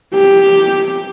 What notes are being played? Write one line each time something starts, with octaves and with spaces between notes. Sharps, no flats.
G4